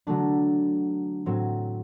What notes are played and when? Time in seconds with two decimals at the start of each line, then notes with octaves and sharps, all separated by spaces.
0.07 D3 F#3 A3 D4 A5
1.26 A2 F#3 C4